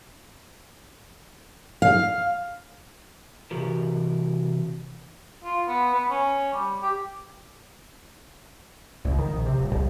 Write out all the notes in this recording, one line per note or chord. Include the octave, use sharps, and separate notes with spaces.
F5
C3 E3 F#4 G4 A#4
F4
B3
B3
C#4
G3
G4
C#2
D#3
A#1
C3
D#1
C2